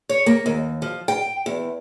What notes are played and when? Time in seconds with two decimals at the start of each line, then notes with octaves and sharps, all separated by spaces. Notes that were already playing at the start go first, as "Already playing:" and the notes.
0.09 C#5
0.26 A#3
0.46 D#2
0.82 F3
1.08 G5
1.46 E2